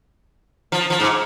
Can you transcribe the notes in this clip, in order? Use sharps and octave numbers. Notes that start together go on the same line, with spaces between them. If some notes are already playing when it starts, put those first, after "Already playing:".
F3
F3
G#2